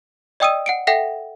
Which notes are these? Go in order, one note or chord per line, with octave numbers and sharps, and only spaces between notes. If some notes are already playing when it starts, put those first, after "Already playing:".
D5 D#5 G5 D#6 E6 D#7
F#5 C#7 D7
A4 E5 F#5 G5 A#6 B6